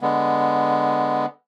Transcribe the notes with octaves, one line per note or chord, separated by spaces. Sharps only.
D3 G#3 B3